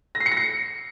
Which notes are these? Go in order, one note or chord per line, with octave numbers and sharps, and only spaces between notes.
A#6
C7
C#7
A#6
C#7